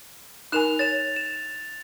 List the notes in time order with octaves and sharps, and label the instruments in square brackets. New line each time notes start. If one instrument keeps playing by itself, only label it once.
[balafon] D#4 A#4 G#5 [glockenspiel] F#6 E7 F7
[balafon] C#5 [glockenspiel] A6 E7
[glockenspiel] E7